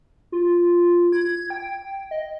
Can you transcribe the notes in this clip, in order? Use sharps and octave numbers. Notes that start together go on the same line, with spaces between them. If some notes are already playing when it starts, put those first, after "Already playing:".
F4
G#6
G5
D#5